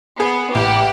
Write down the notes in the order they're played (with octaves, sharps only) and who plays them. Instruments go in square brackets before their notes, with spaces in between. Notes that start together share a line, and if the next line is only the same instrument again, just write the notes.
[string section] B3 [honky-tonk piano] G#4
[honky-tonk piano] A1 [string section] G4 F#5